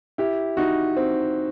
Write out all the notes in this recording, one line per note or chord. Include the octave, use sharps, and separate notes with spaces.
E4 G4
D#4 F#4
C4